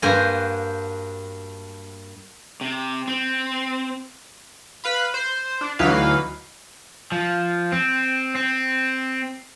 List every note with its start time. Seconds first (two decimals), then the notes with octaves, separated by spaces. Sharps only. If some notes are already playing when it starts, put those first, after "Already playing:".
0.02 G2 A#3 F#4 C5 G#5 A#5
2.61 C3
3.08 C4
4.84 B4 F5 B5
5.14 C5
5.61 D4
5.79 D2 E3 F#3 D#4 B4 F5
7.12 F3
7.72 C4
8.35 C4